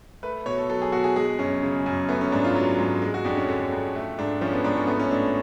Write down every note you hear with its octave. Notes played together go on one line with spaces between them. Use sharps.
A3 B4
B2 C#5
A4
F#3 A4
G#4
B2 F#4
G#4
G#3 G#4
F#2 C#4
C#3
F#2
A3 B3
C#4
G#2 D4
F4
F#3
G#2
G#3
F#4
F2 D4
C#4
D3
F2
A3
G#2 D4
F3 C#4
B3
G#2 D4
C#4
A3 B3
C#4
A2 D4